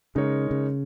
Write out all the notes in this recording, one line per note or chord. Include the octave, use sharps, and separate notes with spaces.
C#3 G#3 D#4 A#4 C#5
C#3